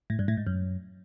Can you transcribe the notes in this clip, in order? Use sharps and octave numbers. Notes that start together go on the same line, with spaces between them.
A2
G2
A2
G#2
F#2